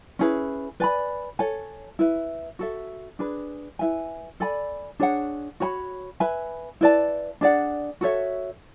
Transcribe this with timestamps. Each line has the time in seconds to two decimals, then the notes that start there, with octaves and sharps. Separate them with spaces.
0.19 C#4 E4 G#4 B4
0.80 B4 D5 G#5 B5
1.39 A4 C#5 G#5
1.99 E4 B4 E5
2.59 F#4 A4 E5
3.19 D4 G#4 B4
3.79 E4 B4 E5 G#5
4.40 A4 D5 G#5 B5
4.99 D4 G#4 C#5 F#5
5.60 F#4 C#5 G#5 B5
6.20 B4 E5 G#5 B5
6.81 E4 B4 D5 A5
7.41 D4 G#4 D5 F#5
8.01 F#4 A4 C#5 E5